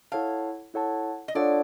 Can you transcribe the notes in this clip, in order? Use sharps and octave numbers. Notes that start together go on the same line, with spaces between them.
E4 A4 C#5 F5 F#5 A5
E4 A4 C#5 F#5 A5
D#5
D4 F4 A4 C#5 D5 F#5